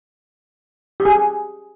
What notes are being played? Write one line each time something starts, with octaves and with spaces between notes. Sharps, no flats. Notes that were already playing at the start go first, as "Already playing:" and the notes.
G4
G#4